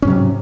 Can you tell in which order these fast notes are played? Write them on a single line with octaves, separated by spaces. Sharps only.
C#4 G#2 F#3 C3